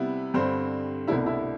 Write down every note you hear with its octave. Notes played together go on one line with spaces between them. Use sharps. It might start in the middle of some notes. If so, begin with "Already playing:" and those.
Already playing: C3 G3 B3 E4
G2 D3 G3 C4 C5
C2 B2 A3 D4 E4 E5
E4 E5